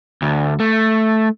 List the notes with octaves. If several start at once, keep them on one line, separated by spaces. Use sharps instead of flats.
D2
A3